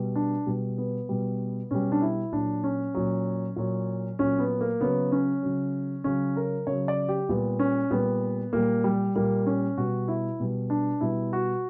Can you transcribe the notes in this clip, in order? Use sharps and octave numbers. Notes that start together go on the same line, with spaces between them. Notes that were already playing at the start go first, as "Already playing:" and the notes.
Already playing: B2 G3
D4
B2 G3
B3
B2 G3
B2 G3 C#4
D4
E4
A#2 F#3 D4
C#4
A#2 F#3
A#2 F#3
A#2 F#3 C#4
B3
A#3
C#3 F#3 B3
C#4
C#3 F#3
C#3 F#3 C#4
A#4
C#3 F#3 C#5
D5
G4
A#2 G3 B3
C#4
A#2 G3 B3
A#2 G3 A#3
G3
A#2 G3 A#3
C#4
B2 G3 F#4
E4
B2 G3
D4
B2 G3 E4
F#4